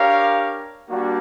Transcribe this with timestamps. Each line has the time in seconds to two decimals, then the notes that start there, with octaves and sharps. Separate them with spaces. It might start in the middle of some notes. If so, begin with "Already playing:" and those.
Already playing: D4 G4 A#4 C#5 F5
0.88 G3 A#3 D4 F#4